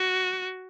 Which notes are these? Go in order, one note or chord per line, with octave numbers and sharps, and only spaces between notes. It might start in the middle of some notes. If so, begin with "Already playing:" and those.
Already playing: F#4